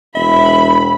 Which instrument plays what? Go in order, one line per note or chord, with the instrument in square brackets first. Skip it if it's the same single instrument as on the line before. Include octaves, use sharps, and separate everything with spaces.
[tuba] E1 [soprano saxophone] E5 [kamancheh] B5